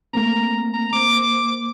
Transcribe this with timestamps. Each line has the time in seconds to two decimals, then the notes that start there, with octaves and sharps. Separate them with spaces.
0.13 A3 A#3 C4 A#5
0.73 A#5
0.93 A#3 C5 D6